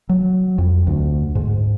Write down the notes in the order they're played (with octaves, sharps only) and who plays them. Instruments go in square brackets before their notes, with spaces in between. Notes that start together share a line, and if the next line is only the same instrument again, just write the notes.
[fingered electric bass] F#3
F2
D2
G#2